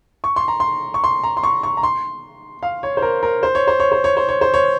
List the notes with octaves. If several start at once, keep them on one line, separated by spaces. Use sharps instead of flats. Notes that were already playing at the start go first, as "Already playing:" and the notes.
C#6
C6
A#5
C6
C#6
C6
A#5
C6
C#6
C#6
A#5
C6
F5
C#5
C5
A#4
A#4
C5
C#5
C5
C#5
C5
C#5
C5
C#5
C5
C#5